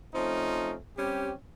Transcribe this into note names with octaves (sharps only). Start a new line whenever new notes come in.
F3 A3 C4 C#4 D#4
G3 C4 C#4 G4